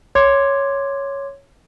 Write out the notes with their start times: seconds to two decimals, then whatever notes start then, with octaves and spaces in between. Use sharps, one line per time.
0.15 C#5 C6 D6 G#6